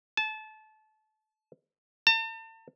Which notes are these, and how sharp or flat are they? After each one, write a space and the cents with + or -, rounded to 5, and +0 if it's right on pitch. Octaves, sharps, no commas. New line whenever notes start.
A5 -25
A5 +40